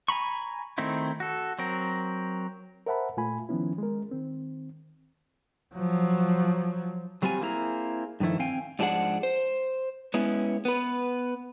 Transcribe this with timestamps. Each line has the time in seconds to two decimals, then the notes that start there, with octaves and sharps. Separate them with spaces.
0.08 G#5 A#5 B5 C#6
0.78 D#3 A3 C4 D#4 E4
1.20 F#4 A4
1.59 F#3 C4 A#4
2.86 A#4 C5 E5 F#5 A5 B5
3.17 A#2 A3 F4 G#5 B5
3.49 D#3 F3 B3 C#4 E4
3.78 G#3 A#4
4.11 D#3 C4
5.75 F3 F#3
7.22 F#3 G3 C4 F4 A#4 G#5
7.41 A#3 C4 E4 G#4 A#5
8.20 G2 D#3 F3 A3 E4
8.39 C4 F5 G5 G#5
8.79 G#2 F3 D4 G4 G#4 F#5
9.23 C5
10.14 G#3 B3 C#4 E4
10.65 B3 B4